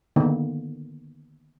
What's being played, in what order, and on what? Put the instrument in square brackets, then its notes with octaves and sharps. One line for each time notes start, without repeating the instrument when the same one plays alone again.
[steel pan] D3 D#3 A#3 B3